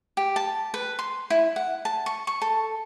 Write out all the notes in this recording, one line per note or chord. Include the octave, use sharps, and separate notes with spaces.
G4
A5
B4
C6
E4
F#5
A5
C#6
C#6
A4